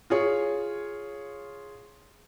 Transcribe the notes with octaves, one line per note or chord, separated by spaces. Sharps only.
F4 G#4 C#5